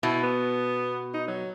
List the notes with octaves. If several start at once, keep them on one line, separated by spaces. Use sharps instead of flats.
B2 E4
B3
D#4
F#3